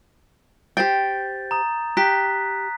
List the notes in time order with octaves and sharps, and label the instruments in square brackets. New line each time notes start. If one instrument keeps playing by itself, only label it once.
[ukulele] G4 C5 G5 [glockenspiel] G6 A6
[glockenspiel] A#5 D#6
[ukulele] G4 [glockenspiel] A#5 F#6 B6